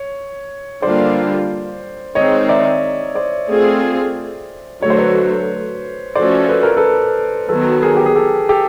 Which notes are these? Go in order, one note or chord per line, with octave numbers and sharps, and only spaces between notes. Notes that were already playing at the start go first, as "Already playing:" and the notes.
Already playing: C#5
D3 G3 A#3 D4 F4 C5 D5
D#3 G#3 C4 D#4 C#5 D#5
D5 E5
C5 D5
A3 C4 F4 G#4
D3 F#3 A3 C#5
C5
B4 C#5
F3 A3 C#4 F#4 A4 C5 D5
B4
A#4
A4 B4
D#3 F#3 B3 A4 B4
G#4 A#4
G4
G#4
G4 A4
G4 A4